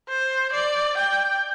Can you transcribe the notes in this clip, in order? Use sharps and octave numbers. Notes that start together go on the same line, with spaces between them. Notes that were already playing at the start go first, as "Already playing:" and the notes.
C5
D5
G5